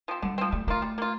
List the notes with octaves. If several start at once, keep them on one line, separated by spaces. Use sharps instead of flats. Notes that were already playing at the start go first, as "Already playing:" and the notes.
F3 C4
D3 G3
F3 C4
G3 A3
A3 A#3 F4
G3
A#3 F4